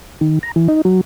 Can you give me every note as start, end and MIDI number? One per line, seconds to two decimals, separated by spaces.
0.21 0.39 51
0.43 0.51 82
0.56 0.68 52
0.68 0.81 63
0.85 1.01 54